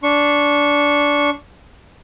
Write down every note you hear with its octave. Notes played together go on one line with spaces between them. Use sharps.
D4 C#6